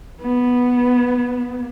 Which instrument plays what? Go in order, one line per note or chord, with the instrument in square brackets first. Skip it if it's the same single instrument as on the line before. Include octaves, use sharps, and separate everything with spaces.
[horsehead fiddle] B3